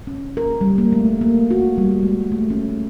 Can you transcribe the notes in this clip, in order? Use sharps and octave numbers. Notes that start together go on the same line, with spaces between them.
C#4
A#4
G3
A#3
A3
A#3
F#4
G3
G#3
A3
C#4